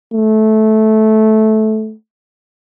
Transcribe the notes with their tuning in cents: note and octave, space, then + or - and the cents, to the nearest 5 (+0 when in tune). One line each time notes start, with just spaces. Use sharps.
A3 -15